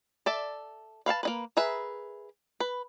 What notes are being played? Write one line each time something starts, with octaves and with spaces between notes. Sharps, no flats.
A4 D5 E5
B4 F5 F#5 A5
A#3 D#4 B4
G#4 A#4 B4 E5
B4